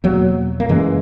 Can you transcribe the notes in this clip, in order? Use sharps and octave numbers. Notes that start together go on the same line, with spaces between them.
E2 B2 F#3 A#3
A#3
F#2 C#3 E3 G#3